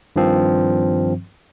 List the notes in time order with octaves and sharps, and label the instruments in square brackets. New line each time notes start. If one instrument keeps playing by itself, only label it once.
[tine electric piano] G2 D#3 F3 C4